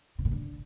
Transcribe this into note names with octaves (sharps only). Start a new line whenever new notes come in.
C3
A#2
D3